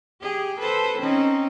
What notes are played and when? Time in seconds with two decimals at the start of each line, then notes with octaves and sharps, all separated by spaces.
0.21 G4 G#4
0.59 A4 B4 C5
0.99 C4 C#4 D#4